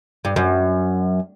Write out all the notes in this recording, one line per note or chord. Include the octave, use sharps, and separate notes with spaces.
G2
F#2